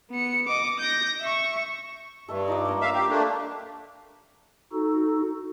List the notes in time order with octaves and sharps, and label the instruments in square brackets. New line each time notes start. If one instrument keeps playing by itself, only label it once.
[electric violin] B3 C#7
D#5 D6
G6 A#6
E5 C#6
[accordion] G2 [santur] A4 E5 C#6
[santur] D#4 F4 D5
A#3 C#5 D6
[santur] D4 F4 A#4 [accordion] E5 F5
[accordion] G4 [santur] A#4
[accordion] A3 A#3 D4
[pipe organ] D#4 F#4 A4